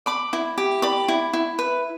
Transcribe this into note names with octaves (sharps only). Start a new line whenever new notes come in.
D5 B5 D6
E4
G4
D5 B5 D6
E4
E4
B4